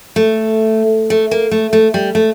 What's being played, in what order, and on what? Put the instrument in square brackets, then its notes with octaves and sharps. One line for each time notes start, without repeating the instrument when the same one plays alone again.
[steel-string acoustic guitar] A3
A3
A#3
A3
A3
G3
A3